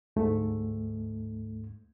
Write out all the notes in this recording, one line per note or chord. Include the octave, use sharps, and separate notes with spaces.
D2 G#2 A3